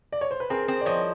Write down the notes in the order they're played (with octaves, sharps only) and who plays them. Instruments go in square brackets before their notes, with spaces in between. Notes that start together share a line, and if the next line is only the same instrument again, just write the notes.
[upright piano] D5
C#5
C5
B4
[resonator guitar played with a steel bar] C4 [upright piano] G#4 A#4
[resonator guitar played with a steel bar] C4
[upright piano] D5
[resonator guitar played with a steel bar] F3 [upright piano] C#5 D#5